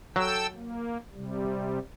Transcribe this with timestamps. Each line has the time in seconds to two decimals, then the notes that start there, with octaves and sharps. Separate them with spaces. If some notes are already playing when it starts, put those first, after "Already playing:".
0.16 F#3 A4 G5 E6
0.55 A#3
1.13 C3 G3